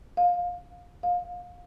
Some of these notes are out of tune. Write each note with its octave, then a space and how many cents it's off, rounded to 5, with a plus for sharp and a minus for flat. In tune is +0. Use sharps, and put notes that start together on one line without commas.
F5 +20
F5 +25